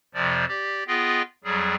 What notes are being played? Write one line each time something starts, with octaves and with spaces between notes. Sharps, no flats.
F2 C3 F3 D5
G4 D5
B3 F4 G#4 D#5 G5
F2 F#3 G3 G#4